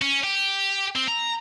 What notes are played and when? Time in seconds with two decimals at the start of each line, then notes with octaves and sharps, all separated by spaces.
0.02 C#4
0.24 G4
0.96 C4
1.08 A#5